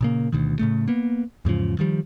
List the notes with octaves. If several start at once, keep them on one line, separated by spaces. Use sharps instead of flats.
A#2 C#3 A#3
D2 B2 D#3
A2 C#3 A3
A#3 B3
E2 G#2 C#3 F3
D#3 F3 G3